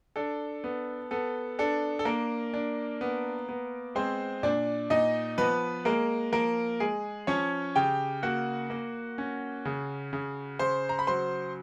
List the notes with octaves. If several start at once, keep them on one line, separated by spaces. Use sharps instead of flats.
D4 A4
B3
B3 A4
D4 A4
A4
A#3 D4 A#4
D4
B3
B3
G#3 C4 C5
A#2 D4 D5
A#2 D#4 D#5
F3 B3 B4
G#3 A#3 A#4
F3 A#3 A#4
G#3 G#4
F3 C#4 C#5
C#3 G4 G5
A#3 F#4 F#5
A#3
C#4
C#3
C#3
C#3 C5 C6
A#5
B5
F#3 C5 C6